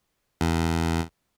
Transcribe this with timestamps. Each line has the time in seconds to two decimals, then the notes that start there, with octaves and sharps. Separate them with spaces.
0.41 E2